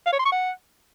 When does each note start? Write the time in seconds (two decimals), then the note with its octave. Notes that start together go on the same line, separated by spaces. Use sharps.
0.06 F5
0.13 C#5
0.19 C6
0.26 C#6
0.32 F#5